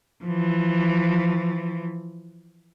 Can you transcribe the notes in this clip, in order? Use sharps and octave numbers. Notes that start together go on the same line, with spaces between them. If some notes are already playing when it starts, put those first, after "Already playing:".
E3 F3